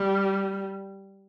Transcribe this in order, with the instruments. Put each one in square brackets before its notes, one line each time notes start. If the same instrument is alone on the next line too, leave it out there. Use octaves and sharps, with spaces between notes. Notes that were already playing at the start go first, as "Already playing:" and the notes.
Already playing: [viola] G3